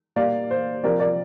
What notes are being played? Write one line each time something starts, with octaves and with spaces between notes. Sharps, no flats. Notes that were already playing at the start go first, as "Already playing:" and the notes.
A#2 G3 A#3 D5 F5
C5
C3 F3 C4 A#4 D5
A#4 D5